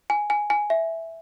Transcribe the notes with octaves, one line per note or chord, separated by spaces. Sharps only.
G#5
G#5
G#5
E5